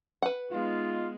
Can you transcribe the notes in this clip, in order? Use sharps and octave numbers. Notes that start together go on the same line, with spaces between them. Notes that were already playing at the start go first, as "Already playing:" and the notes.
B4 F#5
G#3 B3 D#4 F4